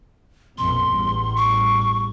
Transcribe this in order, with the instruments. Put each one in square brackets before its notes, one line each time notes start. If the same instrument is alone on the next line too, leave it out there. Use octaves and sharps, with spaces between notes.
[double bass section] A#1 F2 B2 [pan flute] C6
[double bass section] A1 E2 G3
[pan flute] C#6